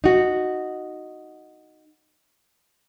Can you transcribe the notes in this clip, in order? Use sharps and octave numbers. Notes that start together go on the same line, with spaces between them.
D#4 F#4